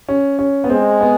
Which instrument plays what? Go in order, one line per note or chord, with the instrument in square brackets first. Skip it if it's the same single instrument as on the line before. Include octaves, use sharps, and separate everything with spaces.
[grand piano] C#4
C#4
B3
[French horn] G#3 [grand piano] C4
[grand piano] B3